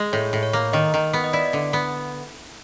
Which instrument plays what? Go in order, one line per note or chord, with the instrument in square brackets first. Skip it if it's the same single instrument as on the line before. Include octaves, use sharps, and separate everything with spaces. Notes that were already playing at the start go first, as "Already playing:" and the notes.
Already playing: [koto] G#3
[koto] A2 [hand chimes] C#5
[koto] A2
[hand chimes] C#5
[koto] A#3
[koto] D#3 [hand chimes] D#5
[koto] D#3
B3
[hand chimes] D#5
[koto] E4 [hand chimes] D5
[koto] D3
B3